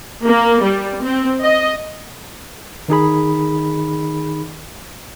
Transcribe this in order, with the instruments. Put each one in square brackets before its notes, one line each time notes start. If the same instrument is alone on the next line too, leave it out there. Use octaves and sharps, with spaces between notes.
[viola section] A#3
G3
C4
D#5
[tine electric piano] D#3 D#4 G#4 B5